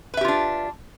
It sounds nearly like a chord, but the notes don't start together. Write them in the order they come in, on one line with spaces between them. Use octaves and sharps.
B4 E5 G4 F4 D4